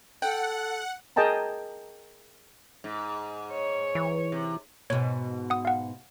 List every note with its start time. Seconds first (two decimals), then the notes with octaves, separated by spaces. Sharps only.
0.22 A4 F#5 G5
1.16 G#4 A#4 D#5 G5 A5 A#5
2.84 G#2
3.53 C#5
3.95 E3
4.32 C3
4.90 G#2 B2 C#5
5.50 F#5 D#6
5.65 F5 F#5